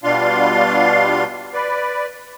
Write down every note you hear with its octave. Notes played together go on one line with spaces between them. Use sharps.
B2 G3 D4 F4 F5 C6
B4 D5